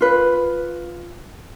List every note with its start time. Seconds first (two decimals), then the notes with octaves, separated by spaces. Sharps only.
0.01 F4 B4